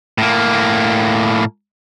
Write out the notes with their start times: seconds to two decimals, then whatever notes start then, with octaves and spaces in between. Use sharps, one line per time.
0.18 A2 A#3